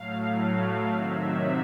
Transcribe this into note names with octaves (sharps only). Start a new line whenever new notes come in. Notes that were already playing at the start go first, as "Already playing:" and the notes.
Already playing: A2 F#3 A3 F5
F5
C3 D#3 F#3 E5